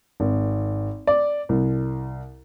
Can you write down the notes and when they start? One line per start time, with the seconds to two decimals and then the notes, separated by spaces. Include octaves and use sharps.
0.20 G#1
1.07 D5
1.49 C2